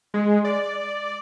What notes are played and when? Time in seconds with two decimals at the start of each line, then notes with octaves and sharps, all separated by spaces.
0.14 G#3
0.45 D5